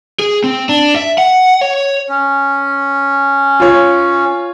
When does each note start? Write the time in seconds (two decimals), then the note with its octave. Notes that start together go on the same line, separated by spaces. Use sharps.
0.19 G#4
0.44 C4
0.69 D4
0.96 E5
1.18 F#5
1.61 C#5
2.09 C#4
3.60 F4 C#5